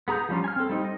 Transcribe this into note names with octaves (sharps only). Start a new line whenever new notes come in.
B3 G#4 A#5 D#6 G6
F3 G3 C#4 F4
G#5 F6
C4 A4
G3 C4 D#4
D#5